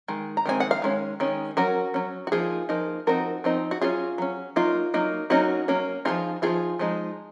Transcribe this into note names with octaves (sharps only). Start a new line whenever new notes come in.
D#3 G#3
A#5
D#3 G#3 C4 G#5
F#5
F5
D#3 G#3 C#4
D#3 G#3 C#4
F#3 C#4 F#4 A#4
F#3 C#4
F#4
F3 A#3 D#4 F4 G#4
F3 A#3 D#4
F3 C4 D#4 F#4 A#4
F3 C4 D#4
F#4
F#3 C#4 F4 G#4
F#3 C#4
F#3 A#3 D#4 F4
F#3 A#3 D#4
F#3 A#3 C#4 D#4 F#4
F#3 A#3 C#4
F3 C4 D#4 F4 G#4
F3 C4 D#4 F4 G#4
F3 G#3 D#4